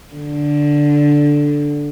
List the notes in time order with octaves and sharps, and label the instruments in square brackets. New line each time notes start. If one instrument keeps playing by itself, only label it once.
[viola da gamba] D3